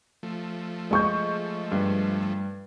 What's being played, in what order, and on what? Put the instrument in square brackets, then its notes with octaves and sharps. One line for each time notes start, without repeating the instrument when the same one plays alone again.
[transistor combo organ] F3 A3
[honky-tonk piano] G#3 C#6 G6
[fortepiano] G2